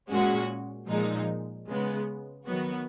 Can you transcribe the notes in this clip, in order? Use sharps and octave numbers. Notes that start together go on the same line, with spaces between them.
A#2 G#3 C#4 F#4
A#2 F3 G#3 D#4
C#3 G#3 B3
D#3 F#3 B3 F#4